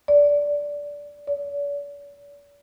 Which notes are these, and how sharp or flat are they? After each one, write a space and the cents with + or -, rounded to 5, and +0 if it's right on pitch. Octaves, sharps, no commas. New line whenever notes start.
D5 -15
D5 -45